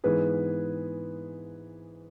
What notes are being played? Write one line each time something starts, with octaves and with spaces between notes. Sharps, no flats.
G#2 E3 B3 G#4 B4